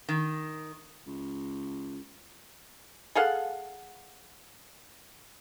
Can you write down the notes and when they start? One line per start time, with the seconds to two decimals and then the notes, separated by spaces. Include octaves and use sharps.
0.09 D#3
1.07 C#2
3.15 G#4 A4 F5 F#5